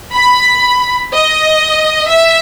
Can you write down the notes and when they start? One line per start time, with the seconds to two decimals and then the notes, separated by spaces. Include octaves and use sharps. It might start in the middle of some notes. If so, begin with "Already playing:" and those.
0.13 B5
1.13 D#5
2.07 E5